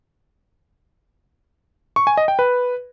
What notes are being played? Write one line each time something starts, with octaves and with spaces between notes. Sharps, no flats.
C#6
G#5
D#5
G5
B4